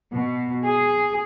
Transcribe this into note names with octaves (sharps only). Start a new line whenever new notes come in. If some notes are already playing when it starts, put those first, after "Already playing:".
B2
G#4